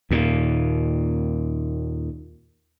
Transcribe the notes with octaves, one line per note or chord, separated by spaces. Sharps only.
D#2 A#2